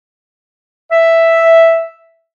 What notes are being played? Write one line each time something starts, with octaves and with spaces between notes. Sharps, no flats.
E5